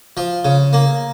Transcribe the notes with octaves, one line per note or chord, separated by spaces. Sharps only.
F3
C#3
A#3